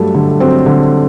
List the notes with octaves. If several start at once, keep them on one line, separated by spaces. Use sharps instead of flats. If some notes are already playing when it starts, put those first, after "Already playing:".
Already playing: G2 F#3 A3
D3
F#3 C4
D3